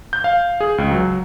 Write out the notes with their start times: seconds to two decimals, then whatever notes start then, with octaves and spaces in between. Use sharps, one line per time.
0.13 G6
0.24 F5
0.61 G#4
0.78 C#2
0.91 F#3